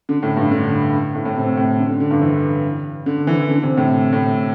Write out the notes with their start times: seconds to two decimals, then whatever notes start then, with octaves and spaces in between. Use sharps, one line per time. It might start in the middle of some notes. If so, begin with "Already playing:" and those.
0.09 D3
0.23 A2
0.37 G2
0.51 D3
1.15 A2
1.25 A2
1.36 C3
1.57 A2
1.79 D3
1.89 D3
2.00 D3
2.11 G2
2.21 E3
3.06 D3
3.27 E3
3.48 D3
3.63 C3
3.77 A2
4.13 A2